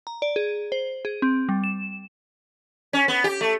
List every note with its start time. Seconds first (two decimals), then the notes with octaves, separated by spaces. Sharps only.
0.07 A#5
0.22 D5
0.36 G#4
0.72 C5
1.05 G#4
1.22 C4
1.49 G3
1.64 E7
2.93 C#4
3.08 B3
3.24 G4
3.41 A3